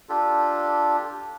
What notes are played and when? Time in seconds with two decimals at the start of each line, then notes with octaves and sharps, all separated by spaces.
0.09 D4 F4 G4 A4